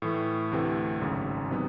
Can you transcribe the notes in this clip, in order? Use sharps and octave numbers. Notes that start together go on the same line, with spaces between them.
A2 E3 A3
D2 C3 E3 A3
G#1 F#2 C#3
C3 D#3 F#3 B3